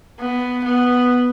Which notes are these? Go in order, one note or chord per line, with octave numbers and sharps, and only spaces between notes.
B3
B3